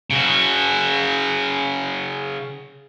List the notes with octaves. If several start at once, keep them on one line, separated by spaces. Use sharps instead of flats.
C#3 F#4